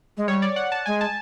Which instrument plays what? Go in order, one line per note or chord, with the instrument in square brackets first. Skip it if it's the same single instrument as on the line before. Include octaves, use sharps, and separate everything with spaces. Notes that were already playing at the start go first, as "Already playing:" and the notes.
[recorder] G#3
[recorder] G3 [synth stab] C#5
[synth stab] D5
F#5
A5
[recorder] G#3 [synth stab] G#5
[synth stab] A5